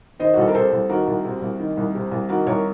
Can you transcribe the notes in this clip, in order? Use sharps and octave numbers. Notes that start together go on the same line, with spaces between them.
D#3 C5 D#5
F#4
C2 A4
A#4
C3 A4 C5
C2
D#3 F#4 A#4
C2
C3
C2
D#3
C2
C3
C2
D#3 F#4 A#4
C2 A#4 C#5